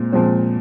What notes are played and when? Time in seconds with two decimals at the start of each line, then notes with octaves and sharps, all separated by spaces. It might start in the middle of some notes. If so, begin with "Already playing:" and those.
Already playing: A#2 G#3 C4
0.13 A#2 F3 G#3 C4